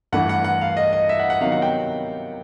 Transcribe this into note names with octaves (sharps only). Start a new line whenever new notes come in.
G2 E3 A3 D4 F#5
F#5
F#5
F5
D#5
D#5
E5
F#5
F#5
C3 D#3 F#3 B3 D#4 F5
F#5
G5